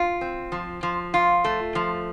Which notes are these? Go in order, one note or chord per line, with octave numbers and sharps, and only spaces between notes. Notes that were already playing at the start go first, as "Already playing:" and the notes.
Already playing: F4
C4
F3
F3
F4
A3
F3